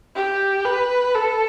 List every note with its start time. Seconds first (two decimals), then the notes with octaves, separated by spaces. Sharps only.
0.16 G4
0.65 B4
1.15 A4